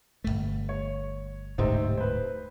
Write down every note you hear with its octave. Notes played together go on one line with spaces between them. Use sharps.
G1 C2 A3
C#5
D1 G#2 C3 A3 C4 D#4
B4 C5